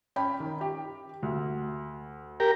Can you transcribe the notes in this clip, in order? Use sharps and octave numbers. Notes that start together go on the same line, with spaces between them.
C#4 G5 B5
D#3
G4
D2
G4 A#4